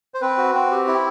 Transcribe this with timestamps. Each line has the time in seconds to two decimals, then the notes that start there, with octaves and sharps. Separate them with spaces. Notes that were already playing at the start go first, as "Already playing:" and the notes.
0.14 C5
0.21 C4 B4
0.38 F#4
0.55 C4
0.71 G4
0.87 E4